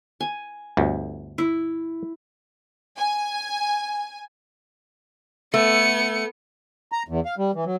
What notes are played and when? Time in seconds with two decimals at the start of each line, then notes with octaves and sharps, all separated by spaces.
0.20 G#5
0.77 G1 D2
1.38 E4
2.98 G#5
5.54 A3 B3 C#7
6.92 A#5
7.08 E2
7.25 F5
7.38 G3
7.54 E3
7.66 F#3